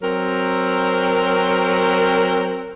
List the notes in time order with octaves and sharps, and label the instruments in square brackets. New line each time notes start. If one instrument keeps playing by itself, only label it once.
[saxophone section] F#3 C4 A#4